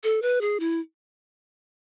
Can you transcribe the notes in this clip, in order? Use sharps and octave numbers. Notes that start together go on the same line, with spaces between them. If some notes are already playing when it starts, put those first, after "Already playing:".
A4
B4
G#4
E4